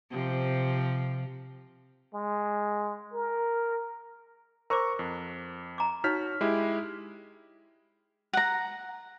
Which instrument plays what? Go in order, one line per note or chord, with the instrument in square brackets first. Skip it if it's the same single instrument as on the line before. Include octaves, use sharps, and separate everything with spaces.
[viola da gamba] C3 F3
[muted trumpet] G#3
A#4
[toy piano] A#4 C5 D6 [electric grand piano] A#5 C#6
[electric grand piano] F2
[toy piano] A#5 D6
[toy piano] D#4 C#5 [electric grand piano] F#4 F6 B6
[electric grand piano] G#3 E4 G4
[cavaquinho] F#5 A#5